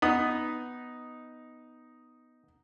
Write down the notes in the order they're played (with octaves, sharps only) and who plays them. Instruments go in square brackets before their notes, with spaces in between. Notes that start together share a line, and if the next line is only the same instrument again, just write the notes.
[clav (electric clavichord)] B3 [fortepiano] D#4 D#6